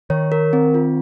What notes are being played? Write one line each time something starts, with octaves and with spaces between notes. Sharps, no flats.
D#3 C#5
A#4
C4
F4